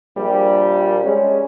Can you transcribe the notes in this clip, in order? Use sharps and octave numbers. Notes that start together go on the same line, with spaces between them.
A#1 G3
G#3 C#4